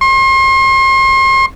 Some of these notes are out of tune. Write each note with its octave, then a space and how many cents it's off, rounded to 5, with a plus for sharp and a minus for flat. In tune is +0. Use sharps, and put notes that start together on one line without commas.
C6 +40